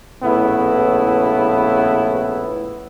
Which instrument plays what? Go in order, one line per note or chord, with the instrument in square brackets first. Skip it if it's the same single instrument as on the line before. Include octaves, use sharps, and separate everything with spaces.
[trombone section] A#1 A2 C#3 B3 E4